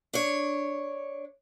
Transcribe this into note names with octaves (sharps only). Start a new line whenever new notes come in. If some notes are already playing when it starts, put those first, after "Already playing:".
D4 C#5